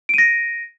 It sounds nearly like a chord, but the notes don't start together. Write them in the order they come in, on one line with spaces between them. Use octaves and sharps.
D7 D#7 A#6